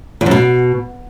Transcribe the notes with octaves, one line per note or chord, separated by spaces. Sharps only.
E2
F#2
B2